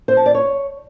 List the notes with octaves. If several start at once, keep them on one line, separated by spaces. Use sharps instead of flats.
C5
A5
D5
C#5